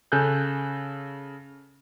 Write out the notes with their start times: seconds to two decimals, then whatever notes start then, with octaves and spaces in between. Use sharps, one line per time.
0.12 C#3 A4 G#5 F#6 G6